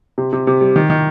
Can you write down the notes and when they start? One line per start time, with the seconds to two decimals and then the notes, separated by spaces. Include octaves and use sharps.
0.18 C3
0.33 C3
0.47 C3
0.61 G3
0.76 D#3
0.90 D#3